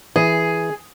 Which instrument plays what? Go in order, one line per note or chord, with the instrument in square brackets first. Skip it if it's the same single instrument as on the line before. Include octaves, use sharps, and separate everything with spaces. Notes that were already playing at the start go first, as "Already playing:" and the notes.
[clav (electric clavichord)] E3 [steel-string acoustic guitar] G#4